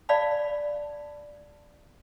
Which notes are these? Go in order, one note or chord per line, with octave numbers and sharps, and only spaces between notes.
D5 F5 A5 B5